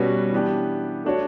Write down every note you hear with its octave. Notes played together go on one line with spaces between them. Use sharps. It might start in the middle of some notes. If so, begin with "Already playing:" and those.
Already playing: B2 G3 C#4 F#4 B4
E3 B3 D4 G4
A3 D4 F#4 C#5